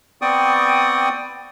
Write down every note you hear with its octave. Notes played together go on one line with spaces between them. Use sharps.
B3 C4 D5 G5 C#6 D#6